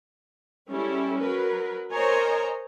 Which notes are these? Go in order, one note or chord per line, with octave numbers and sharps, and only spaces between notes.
G3 G#3 C#4 E4 A4
F#3 A#4 B4
A#4 C5 C#5 D#5 G#5 A#5